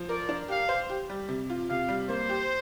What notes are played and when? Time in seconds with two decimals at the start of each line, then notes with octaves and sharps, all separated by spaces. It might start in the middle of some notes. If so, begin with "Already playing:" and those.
Already playing: F3
0.09 A#4 D5
0.29 D4
0.48 G4 F5
0.69 C5
0.90 G4
1.10 G3
1.29 C3
1.50 F4
1.69 C3 F5
1.89 G3
2.09 A#3 C5
2.29 G4